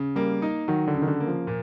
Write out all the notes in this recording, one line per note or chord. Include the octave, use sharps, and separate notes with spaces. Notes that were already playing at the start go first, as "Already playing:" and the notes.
Already playing: C#3
G3 A#3
D#4
D#3 F#3
D3
C#3
D#3
D3
A#3
F3
A#2